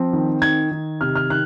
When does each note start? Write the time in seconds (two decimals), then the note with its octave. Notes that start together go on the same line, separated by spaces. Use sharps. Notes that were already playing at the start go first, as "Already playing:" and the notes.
Already playing: F3 C4
0.13 D#3
0.42 D#3 G#6
0.71 D#3
1.01 C3 F6
1.15 F6
1.30 D#3 F#6